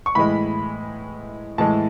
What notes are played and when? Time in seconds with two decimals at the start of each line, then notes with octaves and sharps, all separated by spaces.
0.06 C#6
0.15 A2 E3 G#3 B5
1.58 A2 E3 G#3 A5